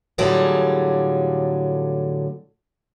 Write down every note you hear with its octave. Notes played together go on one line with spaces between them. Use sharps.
A2 D3 F#3 G3 F4 G#4